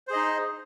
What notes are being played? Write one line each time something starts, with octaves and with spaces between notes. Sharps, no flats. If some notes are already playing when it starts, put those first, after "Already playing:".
D#4 G#4 C5 D#5